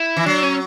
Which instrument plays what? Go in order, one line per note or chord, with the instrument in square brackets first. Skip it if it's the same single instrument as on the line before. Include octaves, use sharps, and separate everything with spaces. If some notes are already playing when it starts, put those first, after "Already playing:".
Already playing: [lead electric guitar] E4
[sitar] E3
[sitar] F#3 [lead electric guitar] D4
[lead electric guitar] C#4